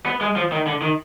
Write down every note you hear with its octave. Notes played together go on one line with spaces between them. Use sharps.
B3
G#3
F3
D#3
D3
D#3